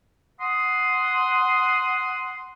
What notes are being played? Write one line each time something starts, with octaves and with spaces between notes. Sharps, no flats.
F#5 C6 D#6